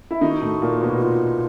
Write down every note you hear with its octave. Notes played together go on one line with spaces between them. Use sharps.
E4
D#3 D#4 F#4
A2 A3
A#2 A#3
B2 B3
F#4
F4